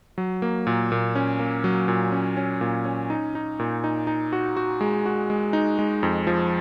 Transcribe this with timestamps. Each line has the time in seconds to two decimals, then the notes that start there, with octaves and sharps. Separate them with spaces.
0.18 F#3
0.42 A#3
0.67 A#2
0.92 A#2
1.15 C#4
1.39 A#3
1.64 F#3
1.88 A#2
2.12 C#4
2.37 C#4
2.61 A#2
2.85 C#4
3.10 D#4
3.35 D#4
3.59 A#2
3.84 D#4
4.07 D#4
4.33 F#4
4.57 F#4
4.81 G#3
5.06 F#4
5.30 G#3
5.53 D#4
5.79 G#3
6.03 F2
6.27 F3